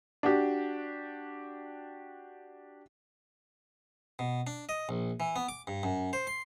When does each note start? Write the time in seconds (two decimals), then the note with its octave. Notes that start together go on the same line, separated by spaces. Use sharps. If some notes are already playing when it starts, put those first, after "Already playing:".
0.23 D4 F#4 G4
4.19 B2
4.47 D4
4.69 D#5
4.89 A#1
5.20 E3
5.36 B3
5.49 D6
5.67 G2
5.83 F#2
6.13 C5
6.27 C6